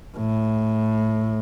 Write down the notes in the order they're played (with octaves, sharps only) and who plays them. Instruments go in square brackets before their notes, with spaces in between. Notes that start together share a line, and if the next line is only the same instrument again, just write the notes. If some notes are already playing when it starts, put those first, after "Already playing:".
[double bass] A2